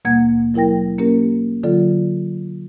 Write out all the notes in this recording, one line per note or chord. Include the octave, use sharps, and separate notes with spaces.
D#2 B2 G3 A#3 F#5 G#6
F#3 E4 A#4 G5 A#6
A#3 C#4 G4 A#4
D3 F#3 F4 A4 D5